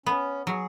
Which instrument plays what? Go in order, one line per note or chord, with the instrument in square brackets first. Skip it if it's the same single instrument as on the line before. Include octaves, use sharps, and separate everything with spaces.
[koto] B3 [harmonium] C#4
[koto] F#3 [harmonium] G#4